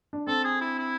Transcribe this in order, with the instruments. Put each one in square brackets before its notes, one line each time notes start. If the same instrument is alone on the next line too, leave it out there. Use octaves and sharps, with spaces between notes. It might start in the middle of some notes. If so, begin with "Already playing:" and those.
[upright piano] D4
[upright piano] C4 [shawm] A4
[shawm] G#4
E4
E4